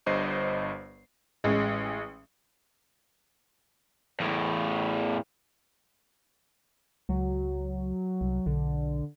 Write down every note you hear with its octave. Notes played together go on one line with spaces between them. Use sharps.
G1 G2 C5 D#5 C7
A1 G#3 C#4
E2 A2
C#2 F#3
C2
B1 D3